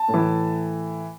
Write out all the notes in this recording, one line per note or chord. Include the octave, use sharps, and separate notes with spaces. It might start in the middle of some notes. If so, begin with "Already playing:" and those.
Already playing: A5
A2
E3